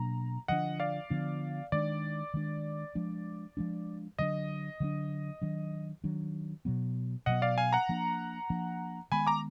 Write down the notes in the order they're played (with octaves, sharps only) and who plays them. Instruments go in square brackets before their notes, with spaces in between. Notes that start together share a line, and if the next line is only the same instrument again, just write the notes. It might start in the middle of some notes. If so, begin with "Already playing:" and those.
Already playing: [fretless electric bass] B2 F#3 A#3 D4 [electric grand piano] A#5
[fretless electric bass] D3 F3 B3 D4 [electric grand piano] D#5 F#5
[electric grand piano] D5 F5
[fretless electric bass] D3 F3 B3 D4
[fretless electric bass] D#3 G#3 D4 [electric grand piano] D5
[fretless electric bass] D#3 G#3 D4
F3 G#3 D4
F3 G#3 D4
[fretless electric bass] D3 F#3 A#3 D4 [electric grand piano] D#5
[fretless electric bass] D3 F#3 A#3 D4
D#3 F#3 D4
D#3 F#3 D4
B2 F#3 B3
[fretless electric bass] B2 F#3 B3 [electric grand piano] D#5 F#5
[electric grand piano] D5 F5
F5 G#5
F#5 A#5
[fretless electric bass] F3 A#3 D4
F3 A#3 D4
[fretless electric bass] D#3 G#3 B3 [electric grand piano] G#5 B5
[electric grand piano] A#5 D6